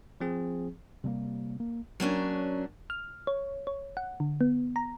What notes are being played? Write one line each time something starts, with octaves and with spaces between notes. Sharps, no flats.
F3 C4 G#4
C3 G3 A3 A#3
A#3
F#3 A#3 C#4 D4
F6
C#5
C#5
F#5
D3
B3
A#5